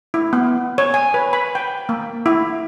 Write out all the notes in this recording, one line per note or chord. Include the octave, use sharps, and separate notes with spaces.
E4
B3
C#5
G#5
B4
B5
G5
A#3
E4